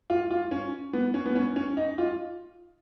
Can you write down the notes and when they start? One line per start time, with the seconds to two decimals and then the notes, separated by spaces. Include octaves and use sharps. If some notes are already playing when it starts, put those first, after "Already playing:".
0.10 F4
0.31 F4
0.51 C#4
0.93 B3
1.14 C#4
1.26 B3
1.35 C#4
1.56 C#4
1.77 D#4
1.98 F4